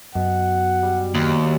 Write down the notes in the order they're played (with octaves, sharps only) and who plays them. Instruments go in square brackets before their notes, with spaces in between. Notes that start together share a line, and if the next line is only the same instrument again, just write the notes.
[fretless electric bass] F#2 [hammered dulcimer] B2 [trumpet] F#5
[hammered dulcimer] G3
[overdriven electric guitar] D#2